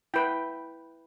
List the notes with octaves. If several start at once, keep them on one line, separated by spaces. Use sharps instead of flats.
E4 B4 G5